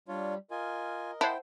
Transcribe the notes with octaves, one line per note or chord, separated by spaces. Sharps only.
G3 D4 F4 C#5
F4 A#4 D#5 G#5
E4 C5 F#5 G5 A5